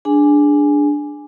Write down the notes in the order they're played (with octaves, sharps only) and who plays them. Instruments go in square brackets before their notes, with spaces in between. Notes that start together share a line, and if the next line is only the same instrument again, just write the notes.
[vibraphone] D4 G#4 G#5